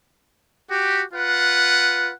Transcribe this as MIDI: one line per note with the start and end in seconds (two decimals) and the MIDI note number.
0.71 1.03 66
0.71 1.03 67
1.14 2.12 65
1.14 2.12 71
1.14 2.12 78